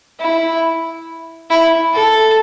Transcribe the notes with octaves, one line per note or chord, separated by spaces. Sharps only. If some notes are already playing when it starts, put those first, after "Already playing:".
E4
E4
A4